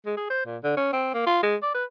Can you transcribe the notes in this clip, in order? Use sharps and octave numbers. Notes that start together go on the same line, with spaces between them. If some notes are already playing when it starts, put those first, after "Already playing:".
G#3
G#4
C5
A#2
D3
C#4
C4
A#3
F4
G#3
D5
B4